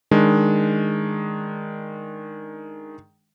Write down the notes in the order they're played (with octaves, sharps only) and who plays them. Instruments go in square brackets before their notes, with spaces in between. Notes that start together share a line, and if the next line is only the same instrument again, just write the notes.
[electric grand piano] D#3 G#3 D4